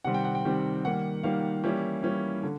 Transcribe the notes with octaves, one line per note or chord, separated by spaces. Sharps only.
C3 D#3 G3 C4 F#5
G5
F#5
G5
C3 D#3 G3 C4
D#3 G3 A#3 F#5
D#3 G3 A#3 F5
E3 G3 A#3 C#4 E4
E3 G3 A#3 C#4 E4
D3